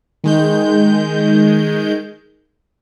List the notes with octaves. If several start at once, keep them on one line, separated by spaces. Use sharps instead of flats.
D#3 G#3 G6